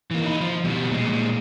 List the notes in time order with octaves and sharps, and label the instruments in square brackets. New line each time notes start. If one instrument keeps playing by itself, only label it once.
[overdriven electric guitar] E3 A#3
D#4 E4
F3
B2 G3
A#2 G#3